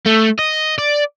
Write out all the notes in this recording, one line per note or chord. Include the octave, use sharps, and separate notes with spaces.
A3
D#5
D5